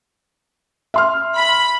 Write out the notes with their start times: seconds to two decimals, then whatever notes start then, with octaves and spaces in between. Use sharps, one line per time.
0.94 E5 C6 F6
1.37 B5